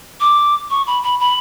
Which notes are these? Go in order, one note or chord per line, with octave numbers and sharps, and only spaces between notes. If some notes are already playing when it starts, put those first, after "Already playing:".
D6
C#6
B5
B5
B5